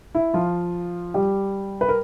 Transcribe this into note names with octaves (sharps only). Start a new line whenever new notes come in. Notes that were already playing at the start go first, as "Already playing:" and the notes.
E4
F3 F4
G3 G4
B4
A#4